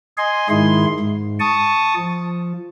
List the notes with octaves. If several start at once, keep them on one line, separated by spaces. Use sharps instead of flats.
D#5 G#5 C6
G#2 D#3 G#3 E4 C6
G#2
A5 C#6 D#6
F3